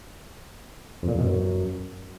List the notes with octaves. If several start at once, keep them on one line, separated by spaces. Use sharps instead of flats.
F2
A#2
E2
B2
F#2